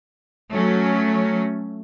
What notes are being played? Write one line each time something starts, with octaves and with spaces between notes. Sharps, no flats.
F#3 A3 C#4